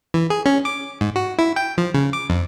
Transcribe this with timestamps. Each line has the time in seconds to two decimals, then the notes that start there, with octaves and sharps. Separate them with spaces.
0.14 E3
0.30 G#4
0.46 C#4
0.65 D6
1.01 G#2
1.16 F#4
1.38 E4
1.56 G5
1.78 F3
1.94 C#3
2.13 D6
2.29 F2